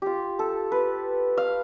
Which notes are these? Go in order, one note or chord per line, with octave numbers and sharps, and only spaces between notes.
F4 G4
A4
B4
F5